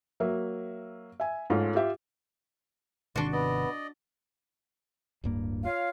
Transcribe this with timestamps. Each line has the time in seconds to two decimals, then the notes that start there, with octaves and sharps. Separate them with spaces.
0.20 F#3 A#3 E5
1.20 E5 G#5
1.50 G#2 A3 C#4 F4
1.75 F4 G4 E5
3.16 G#1 C3 D#3 D4 F#4 D5 C6 C#6
3.32 B3 D5 D#5
5.24 D1 G2 A#3
5.64 F4 C#5 F5